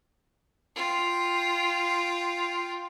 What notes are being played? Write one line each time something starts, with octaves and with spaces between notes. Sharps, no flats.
F4 G5